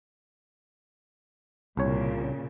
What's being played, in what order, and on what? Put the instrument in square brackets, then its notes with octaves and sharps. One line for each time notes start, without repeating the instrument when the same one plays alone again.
[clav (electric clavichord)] C2 C#5 [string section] A#2 C#3